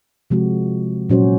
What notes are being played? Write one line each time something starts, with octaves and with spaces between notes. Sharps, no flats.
C3 F3 G#3 C4 F#4
A#2 F#3 C#4 F#4 C5